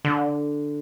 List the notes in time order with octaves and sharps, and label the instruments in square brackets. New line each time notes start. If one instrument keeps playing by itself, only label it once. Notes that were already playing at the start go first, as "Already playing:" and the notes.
[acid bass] D3